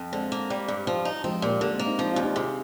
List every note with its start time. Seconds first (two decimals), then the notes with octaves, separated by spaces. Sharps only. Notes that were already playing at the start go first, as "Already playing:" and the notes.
Already playing: F2
0.12 D3 G#3 C4
0.32 A#3
0.50 G3
0.68 G2
0.87 F3
1.05 D#4
1.24 F3 G#3 C4
1.42 A#2 G3 A#3
1.61 D3 G3 A#3
1.73 G#3 C4
1.79 A#3
1.86 C4 D#4
1.98 F3 C4 D#4
2.11 D4 F4
2.16 D#2
2.23 D#4 G4
2.36 C3 F4 G#4